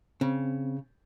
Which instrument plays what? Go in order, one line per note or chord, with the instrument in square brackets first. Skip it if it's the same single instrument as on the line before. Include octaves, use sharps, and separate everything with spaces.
[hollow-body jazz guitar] C#3 [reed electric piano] C4